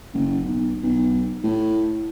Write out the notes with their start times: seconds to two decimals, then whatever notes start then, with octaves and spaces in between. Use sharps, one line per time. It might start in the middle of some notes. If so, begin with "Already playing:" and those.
0.14 F#1
0.44 B1
0.83 B1
1.43 A2